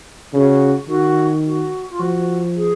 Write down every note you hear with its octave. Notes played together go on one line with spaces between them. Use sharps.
C#3 F#4
D#3 F#4
F#4
F4
F3 F#4
G#4